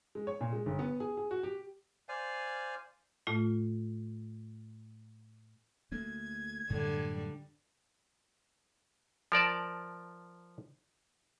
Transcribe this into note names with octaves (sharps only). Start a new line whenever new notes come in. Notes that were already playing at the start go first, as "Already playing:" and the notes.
G#3
C#5
A#2
G#3
G1
B3
G#4
G#4
F#4
G4
C5 D5 F5 G#5
A2 A3 F4
D2 A3 A#3 G#6
F#2 A2 D3 G3
F3 A#4 D5 A5